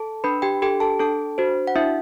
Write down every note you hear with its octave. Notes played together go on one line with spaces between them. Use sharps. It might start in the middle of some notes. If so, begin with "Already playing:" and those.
Already playing: A4 A5
D4 B4 B5
G4 G5
G4 A4 G5
A4 A5
D4 A4 A5
F#4 C5
F#5
D4 E4 E5